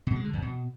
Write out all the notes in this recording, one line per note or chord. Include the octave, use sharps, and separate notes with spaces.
B2
G#3
D3
E2
B2